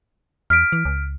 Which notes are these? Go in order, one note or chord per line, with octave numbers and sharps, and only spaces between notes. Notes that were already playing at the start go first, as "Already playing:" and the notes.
E2 F6 B6 D7
E3
C#2